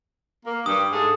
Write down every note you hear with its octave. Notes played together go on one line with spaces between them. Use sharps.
A#3
G2 D#6
G#2 G#4 A4